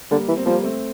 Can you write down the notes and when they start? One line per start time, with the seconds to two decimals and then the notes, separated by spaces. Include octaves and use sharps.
0.11 D3 G3 A#3
0.28 E3
0.37 C4
0.45 F3 G3 A#3
0.63 A3 C4